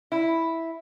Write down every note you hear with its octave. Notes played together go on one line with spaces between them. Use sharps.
E4